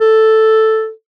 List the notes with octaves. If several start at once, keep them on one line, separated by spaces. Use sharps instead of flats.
A4